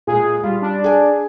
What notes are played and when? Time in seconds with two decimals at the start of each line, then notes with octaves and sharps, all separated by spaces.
0.07 A#2 G#3 G#4
0.44 G3 F4
0.62 D4
0.84 G#4 G#5